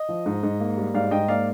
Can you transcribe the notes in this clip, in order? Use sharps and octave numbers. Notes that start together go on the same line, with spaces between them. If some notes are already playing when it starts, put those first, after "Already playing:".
Already playing: D#5
F3
G#2
G#2
A#3
G3
G#2 D5 F5
G#2 D#5 G5
A#3 D5 F5